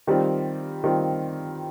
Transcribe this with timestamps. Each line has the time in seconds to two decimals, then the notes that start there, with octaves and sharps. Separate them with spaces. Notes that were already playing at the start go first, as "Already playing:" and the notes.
0.07 D#3 G3 C4 F4
0.84 D#3 G3 C4 F4